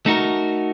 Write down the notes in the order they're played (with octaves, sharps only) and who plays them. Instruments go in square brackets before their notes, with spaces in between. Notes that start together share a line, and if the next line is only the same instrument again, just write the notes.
[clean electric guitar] A3 D#4 F#4 A#4